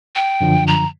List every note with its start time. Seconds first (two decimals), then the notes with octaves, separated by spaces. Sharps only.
0.16 G5
0.41 F#2 D3 F3
0.67 A#5